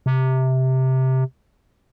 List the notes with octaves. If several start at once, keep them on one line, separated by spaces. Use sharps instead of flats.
C3